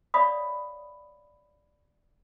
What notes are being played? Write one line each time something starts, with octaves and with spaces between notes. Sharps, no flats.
C#5 D5 E5 F5 B5 D#6